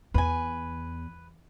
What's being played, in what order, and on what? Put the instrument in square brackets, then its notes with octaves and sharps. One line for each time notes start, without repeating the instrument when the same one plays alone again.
[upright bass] E2 [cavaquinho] B4 G#5